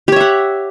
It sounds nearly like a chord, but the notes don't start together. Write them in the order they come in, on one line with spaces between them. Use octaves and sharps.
G4 C#5 E5 F#5